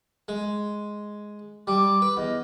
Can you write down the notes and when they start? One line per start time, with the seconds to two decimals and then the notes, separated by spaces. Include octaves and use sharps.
0.28 G#3
1.67 G3 D6
2.02 B4
2.17 E2 D#5